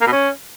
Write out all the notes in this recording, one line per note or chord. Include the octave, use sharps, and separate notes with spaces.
A#3
B2
C#4